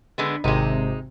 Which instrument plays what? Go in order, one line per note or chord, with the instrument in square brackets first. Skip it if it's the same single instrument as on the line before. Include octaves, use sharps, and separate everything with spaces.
[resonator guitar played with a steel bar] D3 G#3 B3
[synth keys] G#1 C3 [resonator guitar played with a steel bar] G#3 D#4